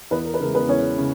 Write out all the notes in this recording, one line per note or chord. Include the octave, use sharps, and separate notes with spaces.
E2 B3 B4
A#4
B4
C#3 E3 G#3 A#4
B3 B4
E2 C#4 C#5
C#3